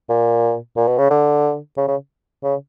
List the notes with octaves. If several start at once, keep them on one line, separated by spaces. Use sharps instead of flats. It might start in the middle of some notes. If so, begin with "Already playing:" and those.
A#2
A#2
B2
C#3
D3
C#3
C#3
C#3